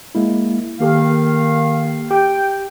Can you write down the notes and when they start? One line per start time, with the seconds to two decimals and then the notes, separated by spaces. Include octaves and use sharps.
0.15 G#3 A#3 E4
0.80 D#3 A#3 G4 A4 F5
2.11 G4 G5